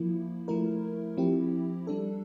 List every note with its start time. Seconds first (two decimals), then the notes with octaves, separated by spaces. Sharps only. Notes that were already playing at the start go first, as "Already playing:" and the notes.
Already playing: F3 A#3 E4
0.48 F3 A3 E4 A#4
1.17 F3 C4 E4 G4
1.87 G3 D4 A4